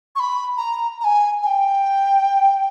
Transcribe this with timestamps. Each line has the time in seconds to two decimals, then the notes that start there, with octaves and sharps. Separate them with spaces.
0.16 C#6
0.20 B5
0.57 A#5
1.01 A#5
1.04 G#5
1.42 G#5
1.46 G5